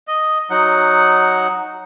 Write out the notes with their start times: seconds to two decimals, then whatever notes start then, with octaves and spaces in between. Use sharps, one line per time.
0.07 D#5
0.50 F#3 D#4 F#5